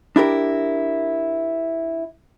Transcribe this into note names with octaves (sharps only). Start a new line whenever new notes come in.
D4 E4 G4 A#4